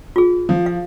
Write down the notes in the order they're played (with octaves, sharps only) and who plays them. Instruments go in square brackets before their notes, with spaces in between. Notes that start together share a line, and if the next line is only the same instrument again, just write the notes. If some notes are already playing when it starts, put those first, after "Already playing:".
[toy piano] F4 G#4
[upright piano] F3
[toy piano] F5